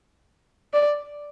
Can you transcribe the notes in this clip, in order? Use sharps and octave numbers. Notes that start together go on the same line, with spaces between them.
D5